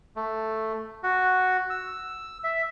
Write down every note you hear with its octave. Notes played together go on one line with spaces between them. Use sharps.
A3
F#4
E6
E5